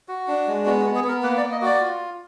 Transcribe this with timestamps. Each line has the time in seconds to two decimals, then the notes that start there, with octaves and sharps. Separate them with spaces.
0.08 F#4
0.28 D4
0.48 G#3
0.65 B3 F#4
0.81 F#4
0.85 B3
0.95 G#4
1.04 B3 A#4
1.23 A#3 B4
1.37 D5
1.42 A#3
1.52 D#5
1.62 F#4 D5
1.81 F4